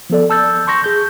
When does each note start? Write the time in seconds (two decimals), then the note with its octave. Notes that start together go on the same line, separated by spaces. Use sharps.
0.10 F3 B3 A4 D5
0.30 A5 E6 G6 A6
0.67 C6 C#6 G6 A#6
0.84 G#4 G6